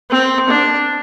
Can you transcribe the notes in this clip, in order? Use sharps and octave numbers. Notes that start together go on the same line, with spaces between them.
C4
D4